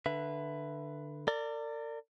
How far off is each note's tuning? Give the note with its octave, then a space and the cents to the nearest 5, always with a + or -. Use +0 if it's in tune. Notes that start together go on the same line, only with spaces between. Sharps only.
D3 +15 B4 +0 E5 +20
A#4 -40 D5 +0